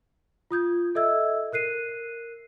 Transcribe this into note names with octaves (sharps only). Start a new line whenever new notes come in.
F4 D#6 G6 G#6
A4 D#5 E5 E6 G#6
A#4 F#6 C7 D#7